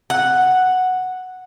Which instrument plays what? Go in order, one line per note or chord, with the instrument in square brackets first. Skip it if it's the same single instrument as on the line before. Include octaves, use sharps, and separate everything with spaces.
[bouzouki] F#5